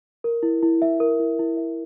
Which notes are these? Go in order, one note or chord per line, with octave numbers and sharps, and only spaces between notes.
A#4
E4
E4
E5
A#4
E4
E4
E5